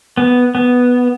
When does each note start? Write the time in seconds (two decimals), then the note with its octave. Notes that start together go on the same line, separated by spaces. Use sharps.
0.17 B3
0.55 B3